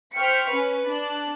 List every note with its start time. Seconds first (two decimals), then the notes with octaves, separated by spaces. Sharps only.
0.14 C5 G5 C#6 F6 B6 C#7
0.52 C#4 B4
0.86 D4 F#6